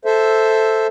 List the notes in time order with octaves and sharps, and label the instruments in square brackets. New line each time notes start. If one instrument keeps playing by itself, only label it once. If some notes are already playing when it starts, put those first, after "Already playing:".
[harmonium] A4 C5 E5